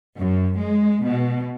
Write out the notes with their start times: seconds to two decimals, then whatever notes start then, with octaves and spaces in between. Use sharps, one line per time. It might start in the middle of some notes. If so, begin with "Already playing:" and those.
0.17 F#2
0.58 G#3
1.01 B2